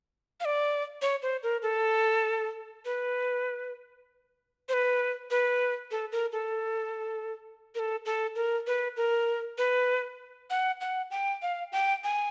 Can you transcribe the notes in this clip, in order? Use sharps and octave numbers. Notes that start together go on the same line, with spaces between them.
F5
D5
C#5
C5
A#4
A4
B4
C5
B4
B4
A4
A#4
A4
A#4
A4
A4
A#4
B4
A#4
B4
F#5
F#5
G5
F5
G5
G#5